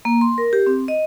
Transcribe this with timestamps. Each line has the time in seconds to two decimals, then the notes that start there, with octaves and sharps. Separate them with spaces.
0.05 A#3
0.21 C6
0.38 A#4
0.53 G4
0.67 C4
0.88 D#5